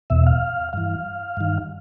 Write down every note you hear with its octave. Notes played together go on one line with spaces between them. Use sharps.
E2 B2 E5
F5
G2 E3 F5
G2 D#3